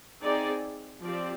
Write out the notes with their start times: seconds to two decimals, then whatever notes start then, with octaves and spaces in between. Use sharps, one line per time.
0.22 C4 D#4 G#4 D5
1.02 F3 C4 G4 D5